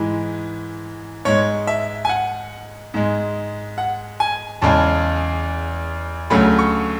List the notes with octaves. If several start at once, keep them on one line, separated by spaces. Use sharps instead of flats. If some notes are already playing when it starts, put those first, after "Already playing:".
Already playing: G#2 E3 G#3
G#2 G#3 C#5
E5
G#5
F#5
G#2 G#3
F#5
G#5
E2 C#3 G#3 A5
D2 C#3 F#3 A3 B5
C#6